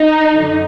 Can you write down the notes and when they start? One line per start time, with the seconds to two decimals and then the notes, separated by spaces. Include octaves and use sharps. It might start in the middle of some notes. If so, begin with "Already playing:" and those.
Already playing: D#4
0.33 F#2 D3 F#3